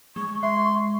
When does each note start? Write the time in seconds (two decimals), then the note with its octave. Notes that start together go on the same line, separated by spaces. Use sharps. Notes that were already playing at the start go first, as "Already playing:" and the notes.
0.16 G#3 C#6
0.43 E5 C6